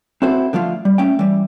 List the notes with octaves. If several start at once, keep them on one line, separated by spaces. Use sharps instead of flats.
C4 E4 F#4 A4 C5
D3 F3 A3 F4
G3
A3 C#4 G5
E3 G3